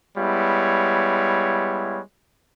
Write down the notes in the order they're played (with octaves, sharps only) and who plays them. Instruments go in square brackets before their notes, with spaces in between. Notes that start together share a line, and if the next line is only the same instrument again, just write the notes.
[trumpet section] G3 G#3 B3 E4 C#5